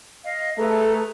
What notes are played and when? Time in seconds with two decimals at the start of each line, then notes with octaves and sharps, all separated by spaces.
0.24 D#5 F5
0.58 A3 G#4 A4 B4 A#5